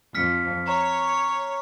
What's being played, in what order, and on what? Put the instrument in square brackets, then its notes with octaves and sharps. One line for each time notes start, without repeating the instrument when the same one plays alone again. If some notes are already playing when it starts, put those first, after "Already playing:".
[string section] F2 [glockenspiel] F6 B6 C#7
[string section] C#5 [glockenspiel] A#5